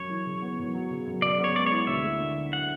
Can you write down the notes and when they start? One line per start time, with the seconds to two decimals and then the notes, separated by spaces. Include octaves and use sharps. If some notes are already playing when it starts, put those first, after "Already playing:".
Already playing: F#2 C#5
0.10 E3
0.26 C#3
0.42 B3
0.58 F#2
0.74 F#3
0.91 C#3
1.06 F#2
1.22 C#3 D5
1.39 B3
1.44 C#5
1.55 G#3 D5
1.66 C#5
1.72 E4
1.87 D2 E5
2.04 A3
2.19 D3
2.36 D4
2.53 F#5